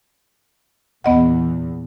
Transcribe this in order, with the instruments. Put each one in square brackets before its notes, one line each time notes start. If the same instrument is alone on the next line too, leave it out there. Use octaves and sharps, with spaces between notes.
[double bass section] E2 A#2 [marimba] B3 D#5 F#5